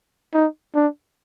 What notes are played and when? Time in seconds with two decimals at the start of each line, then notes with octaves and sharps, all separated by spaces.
0.34 D#4
0.75 D4